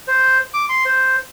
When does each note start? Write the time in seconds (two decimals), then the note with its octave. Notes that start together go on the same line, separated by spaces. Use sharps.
0.08 C5
0.54 D6
0.69 C6
0.85 C5